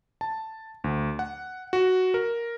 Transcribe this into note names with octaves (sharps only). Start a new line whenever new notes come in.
A5
D2
F#5
F#4
A#4